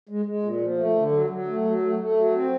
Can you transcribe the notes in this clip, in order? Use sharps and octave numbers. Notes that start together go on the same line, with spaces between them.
G#3
G#3
A#2
F3
A3
D3
F#3
F#3
A3
F#3
A3
A3
F#3
C4